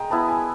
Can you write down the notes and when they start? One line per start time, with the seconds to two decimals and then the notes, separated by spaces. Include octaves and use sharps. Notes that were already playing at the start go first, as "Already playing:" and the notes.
Already playing: G#3 G5 A#5
0.10 B3 E4 A5
0.28 G#5